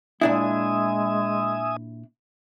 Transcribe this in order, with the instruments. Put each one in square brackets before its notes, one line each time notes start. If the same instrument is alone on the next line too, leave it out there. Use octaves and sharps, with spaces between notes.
[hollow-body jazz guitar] A#2 D4 E4 [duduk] G#3 [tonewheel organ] E5 G#5 D#6